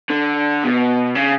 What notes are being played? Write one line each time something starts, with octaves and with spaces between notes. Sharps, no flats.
D3
B2
C#3